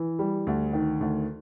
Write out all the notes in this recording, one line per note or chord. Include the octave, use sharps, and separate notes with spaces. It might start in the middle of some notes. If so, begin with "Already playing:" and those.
Already playing: E3
G3
D2
D#3
D2